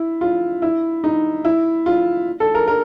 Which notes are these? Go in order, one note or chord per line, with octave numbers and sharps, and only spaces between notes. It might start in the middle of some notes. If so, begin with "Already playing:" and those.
Already playing: E4
F4
E4
D#4
E4
F4
A4
A#4
A#4